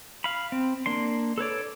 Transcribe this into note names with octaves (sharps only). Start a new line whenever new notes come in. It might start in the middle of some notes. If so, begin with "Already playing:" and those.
F5 B5
C4
A#3 D4 C6
A4 B4 C#5 D5